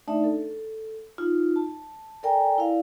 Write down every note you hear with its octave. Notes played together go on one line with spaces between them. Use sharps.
A3 D4 D#4 D5 E5 A5
A4
D#4 F4
A5
A4 A#4 D5 G5 G#5 A#5
E4 A#4 D5 F5